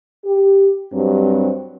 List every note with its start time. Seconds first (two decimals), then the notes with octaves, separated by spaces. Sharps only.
0.24 G4
0.92 G2 F#3 G3 C4